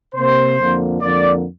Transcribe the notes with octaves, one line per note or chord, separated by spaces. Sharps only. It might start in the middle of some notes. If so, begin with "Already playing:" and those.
C3 A#3 C5
F2 D3 F3 A#3
F2 D3 A#3 D5